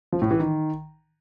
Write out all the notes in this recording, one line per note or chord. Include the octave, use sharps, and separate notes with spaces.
F3
A2
E3
D#3